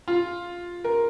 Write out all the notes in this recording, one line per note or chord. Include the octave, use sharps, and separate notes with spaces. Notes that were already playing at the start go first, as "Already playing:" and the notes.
F4
A#4